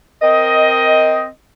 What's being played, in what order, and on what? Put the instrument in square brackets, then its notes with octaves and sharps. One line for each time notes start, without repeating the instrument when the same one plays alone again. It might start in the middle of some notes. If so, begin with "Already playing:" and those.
[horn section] C4 A#4 D#5